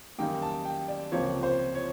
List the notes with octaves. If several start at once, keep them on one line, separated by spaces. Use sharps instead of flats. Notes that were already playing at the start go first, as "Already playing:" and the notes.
F#2 D#3 G3 A#3 D#4 G5
A5
G5
D5
C#2 C3 F3 A#3 C#5
C5
C#5